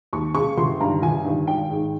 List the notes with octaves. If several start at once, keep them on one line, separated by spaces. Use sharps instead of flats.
D#2 C#6
C#3 C#6
G1 C6
G2 D#3 A#5
G1 G#5
G2 D#3
G#1 G5
G#2 D#3